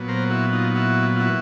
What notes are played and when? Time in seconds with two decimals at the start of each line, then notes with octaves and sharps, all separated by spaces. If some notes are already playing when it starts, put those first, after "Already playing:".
Already playing: A#2 F#3 B3
0.08 A#4 C5
0.30 E4 F#4
0.52 D#4 F4
0.75 E4 F#4
1.16 F4
1.20 E4 F#4